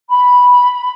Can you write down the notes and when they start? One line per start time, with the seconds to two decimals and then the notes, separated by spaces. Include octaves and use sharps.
0.08 B5